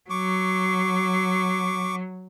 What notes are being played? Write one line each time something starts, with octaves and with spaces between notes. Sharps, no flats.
F#3 C#6 D6